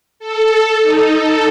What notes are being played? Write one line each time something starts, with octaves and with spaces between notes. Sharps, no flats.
A4
D#4
A4